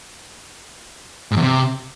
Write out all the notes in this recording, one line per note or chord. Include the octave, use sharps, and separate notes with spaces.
G#2
E2
C3